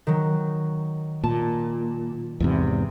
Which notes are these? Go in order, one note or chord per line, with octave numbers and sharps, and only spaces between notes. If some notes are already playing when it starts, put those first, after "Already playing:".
D#3 F#3
A#2 A5
E2 G#2 C3